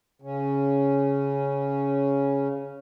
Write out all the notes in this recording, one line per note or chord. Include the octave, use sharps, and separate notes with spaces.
C#3 C#4